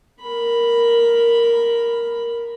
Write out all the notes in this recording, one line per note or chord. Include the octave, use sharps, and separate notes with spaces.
A#4 B5